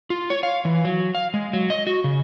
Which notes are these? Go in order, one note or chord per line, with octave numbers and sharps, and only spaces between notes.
F4
C#5
F5
E3
F#3
F5
G#3
F#3
D#5
F#4
C#3